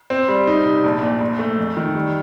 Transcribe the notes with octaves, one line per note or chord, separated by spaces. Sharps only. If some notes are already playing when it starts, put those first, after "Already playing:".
C4
G3
D#4
C3
A#1
A#2
A#1
A3
F2
D#3
G3